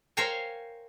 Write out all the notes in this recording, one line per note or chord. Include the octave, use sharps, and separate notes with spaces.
A#4 C5 C#5 F5 G5 G#5